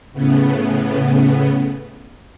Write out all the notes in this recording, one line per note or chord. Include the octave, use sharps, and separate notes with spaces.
A2 C#3 B3